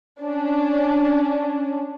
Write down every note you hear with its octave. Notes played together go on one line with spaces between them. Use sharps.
C#4 D4